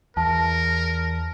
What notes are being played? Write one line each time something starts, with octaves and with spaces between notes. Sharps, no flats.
E2 A#4 A5